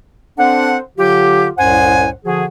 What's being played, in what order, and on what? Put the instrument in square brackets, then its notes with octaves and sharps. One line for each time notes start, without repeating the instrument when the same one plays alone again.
[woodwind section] C4 D4 A4 C5 F#5
D3 F#3 F4 G4
C2 F#2 A2 C5 F#5 G#5
D3 F3 F#4 G#4